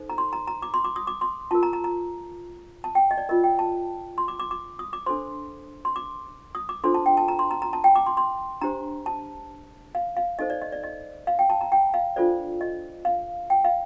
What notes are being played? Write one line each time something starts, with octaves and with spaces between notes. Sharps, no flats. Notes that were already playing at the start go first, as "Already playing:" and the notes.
Already playing: D#4 A4 C5
A#5
C6
A#5
A#5
D6
C6
D6
D#6
D6
C6
F4 A#4 A5
A#5
A#5
A#5
A5
G5
D#5
D5
F4 A#4 D#5
G5
A5
C6
D6
D6
D6
D#6
D6
D4 A4 C5 C6
C6
D6
D#6
D6
D4 F4 A4 C5 C6
A5
G5
A5
A#5
C6
A#5
A#5
A5
G5
D6
C6
C6
D4 G4 C5 A#5
A5
F5
F5
D#4 A4 C5 D#5
D5
D#5
D5
D#5
F5
G5
A5
A#5
G5
F5
D4 F4 A4 C5 D5
D#5
F5
G5
F5